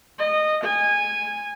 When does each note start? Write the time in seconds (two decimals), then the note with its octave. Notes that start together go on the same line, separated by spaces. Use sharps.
0.18 D#5
0.64 G#5